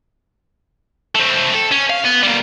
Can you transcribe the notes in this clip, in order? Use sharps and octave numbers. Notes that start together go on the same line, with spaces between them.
A3 C4
A4
C#4
F5
B3
G3 A#3